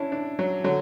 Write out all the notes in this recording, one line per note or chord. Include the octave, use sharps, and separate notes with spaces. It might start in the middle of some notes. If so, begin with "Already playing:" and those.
Already playing: C#4 D4 E4
D4
F#3
D3 F#3